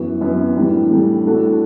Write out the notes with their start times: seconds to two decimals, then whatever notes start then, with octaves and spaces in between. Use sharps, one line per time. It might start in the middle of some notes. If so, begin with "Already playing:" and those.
Already playing: F#2 E3 B3 F#4
0.21 F#2 E3 B3 F#4
0.56 A2 E3 G3 D4
0.90 A2 E3 G3 D4
1.25 A2 G3 D4 F#4 A4